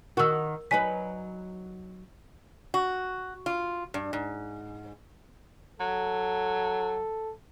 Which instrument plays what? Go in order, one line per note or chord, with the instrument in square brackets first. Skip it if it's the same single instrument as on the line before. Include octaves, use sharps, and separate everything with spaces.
[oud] D#3 F#4 [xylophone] A#4 E6
[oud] F#3 D#4 B4 [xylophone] G#5 B6
[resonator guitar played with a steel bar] F#4
F4
G2
G#2
[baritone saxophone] F#3 [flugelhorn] A4